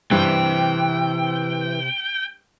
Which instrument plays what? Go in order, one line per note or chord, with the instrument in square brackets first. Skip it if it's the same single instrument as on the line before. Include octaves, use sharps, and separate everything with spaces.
[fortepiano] G2 [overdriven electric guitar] C3 C5 [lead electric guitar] E3 [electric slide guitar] G5